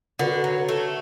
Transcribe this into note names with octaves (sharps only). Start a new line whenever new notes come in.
D3 F#4 B4
F#3
A3